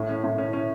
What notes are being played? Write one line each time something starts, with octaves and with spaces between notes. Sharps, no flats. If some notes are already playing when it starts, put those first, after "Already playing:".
Already playing: A2
C#4
A2
C#4
C#4